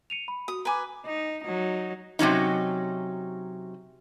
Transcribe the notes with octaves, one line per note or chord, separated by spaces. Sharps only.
C#7 D#7 F7
B5
F#4 D#6
B4 G#5 A#5 B5 D6
D#4
F#3 D#4
C3 F#3 C#4 D#4